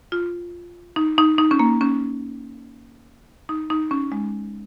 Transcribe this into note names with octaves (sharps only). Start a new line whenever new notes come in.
F4
D#4
D#4
D#4
C#4
A#3
C#4
D#4
D#4
C#4
G#3